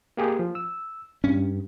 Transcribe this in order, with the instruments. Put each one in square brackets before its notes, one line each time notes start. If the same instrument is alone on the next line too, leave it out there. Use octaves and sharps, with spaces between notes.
[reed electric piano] A#3 G4 G#4
F3
E6
[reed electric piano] G2 [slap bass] C#4